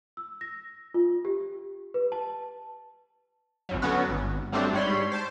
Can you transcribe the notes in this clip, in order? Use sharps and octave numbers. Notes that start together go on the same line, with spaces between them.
E6
A#6
F4
G4
B4
A5
G#1 F2 F#3
D3 F#3 B3 C#4 F#4
G#1
F#3 G3 A3 C4 D4 C5
G#2 G3 C#5 B5 C6
C5 A5 D7